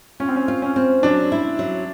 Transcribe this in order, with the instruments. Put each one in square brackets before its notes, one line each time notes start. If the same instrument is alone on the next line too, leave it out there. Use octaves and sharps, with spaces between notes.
[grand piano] C#4 [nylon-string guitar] F4
[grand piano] C4
C#4
[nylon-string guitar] F4
[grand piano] C#4
[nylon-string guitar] C4
[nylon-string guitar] F#3 [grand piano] D4
[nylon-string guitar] E4
F#3